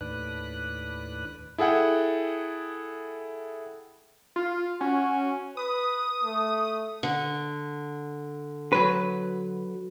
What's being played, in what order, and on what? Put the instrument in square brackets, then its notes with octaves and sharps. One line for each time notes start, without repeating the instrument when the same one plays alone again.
[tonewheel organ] D#2 A2 D4 B4 F#6
[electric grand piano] E4 G#4 A4 F#5 G5
[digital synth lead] F4
[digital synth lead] C#4 [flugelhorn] F#4
[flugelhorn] B4 [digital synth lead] D#6
[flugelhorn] A3
[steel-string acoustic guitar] D3
[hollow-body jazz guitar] F#3 B4